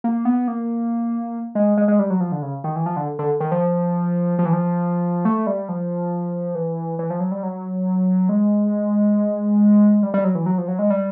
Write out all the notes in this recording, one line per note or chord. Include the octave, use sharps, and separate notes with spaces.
A#3
B3
A#3
G#3
G#3
G#3
G3
F#3
F3
D3
C#3
D#3
E3
F3
D3
D3
D#3
F3
F3
E3
F3
A3
G3
F3
E3
E3
F3
F#3
G3
F#3
G#3
G3
G3
F#3
E3
F#3
F3
F#3
G#3
G3